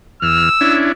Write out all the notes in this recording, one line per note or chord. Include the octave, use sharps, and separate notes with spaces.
E2 E6 F6
C#4 D4 E4